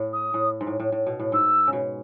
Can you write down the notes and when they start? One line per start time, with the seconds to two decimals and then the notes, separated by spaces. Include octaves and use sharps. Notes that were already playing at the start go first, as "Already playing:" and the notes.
Already playing: A2
0.13 D#6
0.34 A2
0.61 G#2
0.67 A2
0.80 A2
0.92 A2
1.07 B2
1.19 A2
1.32 G#2 E6
1.67 C#3
1.73 B2